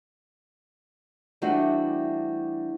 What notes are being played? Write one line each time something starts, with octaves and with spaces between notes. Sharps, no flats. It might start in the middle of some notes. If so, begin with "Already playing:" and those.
E3 G3 A3 C4 D4 F#4